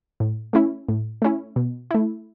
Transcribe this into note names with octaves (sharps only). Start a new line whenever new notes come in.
A2
A3 C#4 E4
A2
A3 C#4 E4
B2
A3 E4